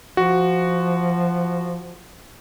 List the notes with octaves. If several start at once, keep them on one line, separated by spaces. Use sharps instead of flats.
F3 F#4